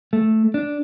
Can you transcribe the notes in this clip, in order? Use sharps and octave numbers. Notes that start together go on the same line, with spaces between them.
A3
D4